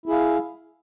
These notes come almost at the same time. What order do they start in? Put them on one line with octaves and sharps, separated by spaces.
E4 G#4 F5